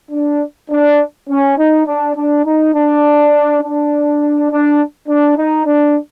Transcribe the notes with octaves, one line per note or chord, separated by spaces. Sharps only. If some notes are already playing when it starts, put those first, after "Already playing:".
D4
D4
C#4
D#4
D4
D4
D#4
D4
D4
D4
D4
D#4
D4